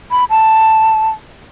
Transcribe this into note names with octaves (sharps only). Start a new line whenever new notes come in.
B5
A5